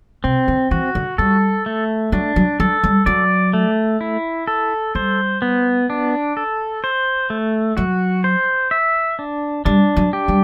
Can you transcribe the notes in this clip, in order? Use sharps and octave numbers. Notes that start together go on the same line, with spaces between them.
C3 C4
D3
E3 F#4
D3
G3 A4
A3
F#3 D4
F#3
F#3 A4
G3
F#3 D5
A3
E4
A4
G3 C5
B3
D4
A4
C5
A3
F#3 F#4
C5
E5
D4
G3 D4
F#3
G4
G3